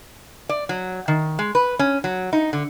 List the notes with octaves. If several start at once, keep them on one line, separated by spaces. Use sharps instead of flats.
D5
F#3
D#3
G#3
B4
C#4
F#3
D#4
D3